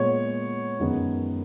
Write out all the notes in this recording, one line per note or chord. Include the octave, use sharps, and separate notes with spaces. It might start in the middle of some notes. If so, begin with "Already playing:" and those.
Already playing: A#2 G#3 B3 C#5
F#2 D#3 G#3 B3